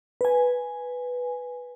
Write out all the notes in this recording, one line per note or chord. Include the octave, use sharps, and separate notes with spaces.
B4 G#5